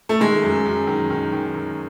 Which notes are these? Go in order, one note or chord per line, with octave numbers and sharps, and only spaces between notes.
A3
D#3 G#3
F#2
F#2
D#3
D#3
D#3
D#3